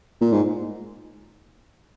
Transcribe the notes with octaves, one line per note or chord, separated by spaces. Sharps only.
A#2
G#2